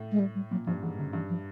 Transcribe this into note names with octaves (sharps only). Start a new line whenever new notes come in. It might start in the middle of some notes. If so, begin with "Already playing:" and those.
Already playing: A2
G#3
G3
G3
A#2 F#3
G2 F3
G#2 E3
F#2 D3
G2 E3
F3